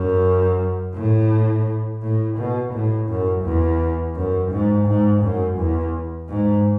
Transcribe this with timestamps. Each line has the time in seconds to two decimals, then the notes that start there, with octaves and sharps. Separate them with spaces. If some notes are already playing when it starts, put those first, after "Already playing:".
Already playing: F#2
0.95 A2
2.02 A2
2.37 B2
2.73 A2
3.08 F#2
3.45 E2
4.15 F#2
4.51 G#2
4.87 G#2
5.22 F#2
5.58 E2
6.29 G#2